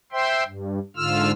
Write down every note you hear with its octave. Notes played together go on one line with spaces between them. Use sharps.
C5 E5 G5 C6
G2
G#2 D3 F4 E6 F6